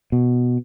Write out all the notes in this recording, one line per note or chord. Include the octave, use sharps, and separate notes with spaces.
B2